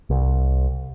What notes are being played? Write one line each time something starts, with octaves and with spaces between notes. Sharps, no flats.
C2